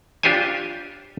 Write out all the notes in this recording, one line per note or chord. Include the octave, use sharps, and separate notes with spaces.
D4 F4 G4 C5 C#5 G#5